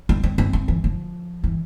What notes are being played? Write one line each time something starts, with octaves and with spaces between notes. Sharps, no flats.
C4
C4
C4
C4
E3
F3
E3